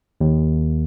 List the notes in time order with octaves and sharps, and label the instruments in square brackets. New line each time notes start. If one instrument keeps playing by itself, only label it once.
[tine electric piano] D#2